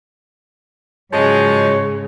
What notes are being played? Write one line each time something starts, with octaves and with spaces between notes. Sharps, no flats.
G#2 C#3 F3 F#3 G#3 C#5